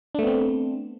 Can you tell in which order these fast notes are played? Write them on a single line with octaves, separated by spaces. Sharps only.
D4 A3 B3 C4